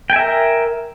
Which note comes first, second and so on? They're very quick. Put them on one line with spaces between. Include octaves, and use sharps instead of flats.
G5 G#5 E5 A#4